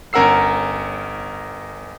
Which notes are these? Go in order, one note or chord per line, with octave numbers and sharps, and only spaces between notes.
G1 C#4 A#4 F#5 E6 C7